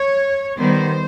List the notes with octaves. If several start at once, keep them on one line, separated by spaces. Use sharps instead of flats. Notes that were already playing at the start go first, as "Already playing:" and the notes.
Already playing: C#5
D#3 G3 B3 C5